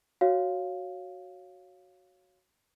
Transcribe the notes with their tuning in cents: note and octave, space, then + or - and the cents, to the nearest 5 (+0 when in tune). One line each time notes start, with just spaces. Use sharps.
F#4 +0 C#5 +0 F5 +0